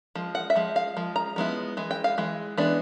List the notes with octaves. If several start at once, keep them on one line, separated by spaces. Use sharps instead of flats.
F3 G#3
F#5
E5
F3 G#3
F5
F3 G#3
A#5
F3 G#3 B3 E4
E3 G#3
G5
F5
E3 G#3
E3 G#3 B3 D4